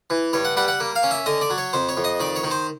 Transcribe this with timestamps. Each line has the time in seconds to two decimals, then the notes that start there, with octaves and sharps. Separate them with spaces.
0.10 E3
0.33 G2 C#5
0.45 F#5
0.57 G3 F#5
0.68 F#5
0.80 A#3
0.96 F5
1.03 C#4
1.11 E5
1.26 D3 D#5
1.41 D5
1.50 F#3
1.58 C#5
1.73 F2 C5
1.89 C#5
1.97 F2
2.04 D#5
2.20 D#3 D5
2.36 C#5
2.44 D#3
2.51 C5